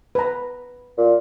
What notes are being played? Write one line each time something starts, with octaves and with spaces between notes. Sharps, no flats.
B4 A#5
A#2